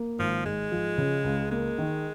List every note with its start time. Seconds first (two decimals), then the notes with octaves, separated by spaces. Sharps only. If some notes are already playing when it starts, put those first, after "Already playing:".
Already playing: A#3
0.19 G#1 F3
0.45 G#2 G#3
0.72 F3
0.98 C#3
1.24 C#2
1.51 G#3 A#3
1.78 D#3